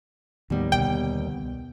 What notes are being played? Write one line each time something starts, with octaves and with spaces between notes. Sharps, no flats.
D#2 A2 D#3 G3 B3
C2 B2 D3 G5